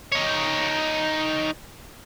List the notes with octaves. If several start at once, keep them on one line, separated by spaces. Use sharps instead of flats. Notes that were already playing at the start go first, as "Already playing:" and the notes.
D#4 C#5